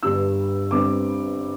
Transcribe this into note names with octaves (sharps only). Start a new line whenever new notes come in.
G1 G2 G3 D4 E6
G1 G2 G3 C4 D6